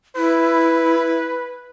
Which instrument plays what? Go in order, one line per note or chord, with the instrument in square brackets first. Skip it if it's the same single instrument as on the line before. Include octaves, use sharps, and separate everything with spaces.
[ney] E4 [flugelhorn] B4